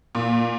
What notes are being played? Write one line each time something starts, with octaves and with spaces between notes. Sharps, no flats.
A#2